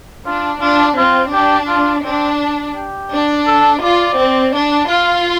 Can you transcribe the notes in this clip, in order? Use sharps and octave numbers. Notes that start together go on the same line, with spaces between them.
D4 F4
D4 F4
C4 F4
D4 G4
F4
C4 D4
G4
D4
A4
F4 D5
C4
D4
F4 F5